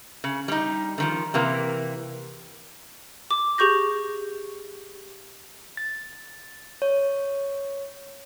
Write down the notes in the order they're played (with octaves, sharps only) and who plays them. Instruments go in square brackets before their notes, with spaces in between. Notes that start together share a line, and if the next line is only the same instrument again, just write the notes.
[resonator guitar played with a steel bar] C#3
G3 D#4
D3 D#3 F3
C3 E3 A#3
[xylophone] D6
G4 G#4 C#6 G6 A#6
[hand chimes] A6
C#5